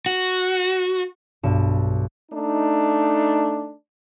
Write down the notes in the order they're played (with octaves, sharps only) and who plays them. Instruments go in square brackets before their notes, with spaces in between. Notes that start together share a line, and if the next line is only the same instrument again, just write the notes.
[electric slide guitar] F#4
[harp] B1 G2 E7
[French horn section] A3 D4 D#4